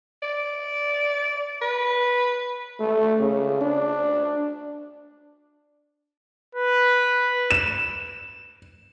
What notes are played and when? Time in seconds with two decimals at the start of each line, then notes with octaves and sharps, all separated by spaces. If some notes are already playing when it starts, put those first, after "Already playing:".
0.23 D5
1.62 B4
2.80 A3
3.20 C#3
3.61 D4
6.55 B4
7.51 E7